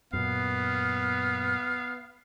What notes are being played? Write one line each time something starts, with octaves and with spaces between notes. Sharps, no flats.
F#2 A#2 B3 F5